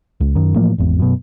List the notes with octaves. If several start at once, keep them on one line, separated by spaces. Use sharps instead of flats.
C#2
F#2 D#3
A2 E3 F3 A#3
G#1 E2
F#2 B2